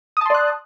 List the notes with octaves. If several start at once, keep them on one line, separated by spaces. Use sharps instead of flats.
D5 A5 C6 D#6 F#6